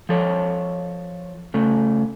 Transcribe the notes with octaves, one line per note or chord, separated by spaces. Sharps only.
F3 A4 C#5
C#3 A3